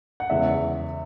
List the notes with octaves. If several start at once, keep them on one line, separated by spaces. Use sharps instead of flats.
F#5
E2 C#3 E3 G#3 E5